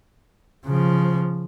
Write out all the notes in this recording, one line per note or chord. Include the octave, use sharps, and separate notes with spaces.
C#3 F3